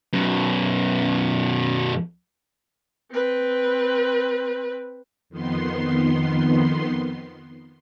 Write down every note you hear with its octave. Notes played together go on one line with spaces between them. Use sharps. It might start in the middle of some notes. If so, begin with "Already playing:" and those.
F#2 B2
C4 B4
F2 D#3 B3 C6